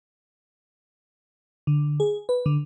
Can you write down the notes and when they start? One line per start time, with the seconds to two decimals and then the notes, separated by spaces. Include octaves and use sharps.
1.67 D3
2.00 G#4
2.29 B4
2.46 D3